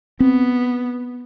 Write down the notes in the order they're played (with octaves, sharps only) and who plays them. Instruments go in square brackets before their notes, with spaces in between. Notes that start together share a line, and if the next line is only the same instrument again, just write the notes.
[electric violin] B3 [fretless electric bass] C4